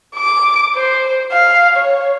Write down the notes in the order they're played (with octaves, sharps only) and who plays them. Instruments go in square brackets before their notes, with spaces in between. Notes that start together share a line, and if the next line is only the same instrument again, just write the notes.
[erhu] D6
C5
F5
C#5